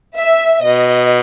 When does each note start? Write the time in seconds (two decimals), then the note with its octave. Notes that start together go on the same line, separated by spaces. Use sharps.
0.17 E5
0.62 B2 D#5